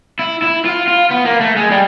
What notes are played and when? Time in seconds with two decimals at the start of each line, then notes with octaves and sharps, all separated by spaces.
0.19 E4
0.42 E4
0.65 F4
0.87 F4
1.10 B3
1.25 A#3
1.40 A3
1.56 G#3
1.71 G3